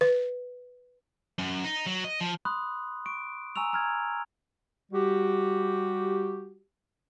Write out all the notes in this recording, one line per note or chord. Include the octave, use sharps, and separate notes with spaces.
B4
F#2
D#4
F#3
D#5
F3
B5 C6 D#6 F#6
C#6 D7
G#5 A#5 C#6 E6 F7
A#5 F6 G#6
G3 F#4 G4